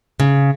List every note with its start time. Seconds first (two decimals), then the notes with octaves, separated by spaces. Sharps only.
0.20 C#3